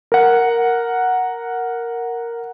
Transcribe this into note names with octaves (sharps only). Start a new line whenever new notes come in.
A#4 F#5